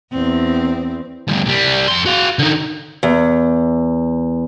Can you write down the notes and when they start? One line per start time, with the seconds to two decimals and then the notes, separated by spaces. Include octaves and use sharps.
0.12 E2 C4
1.28 D2 G2
1.46 C2 G3
1.88 F2 C6
2.06 F#4 F5
2.39 D3 D#4
3.03 E2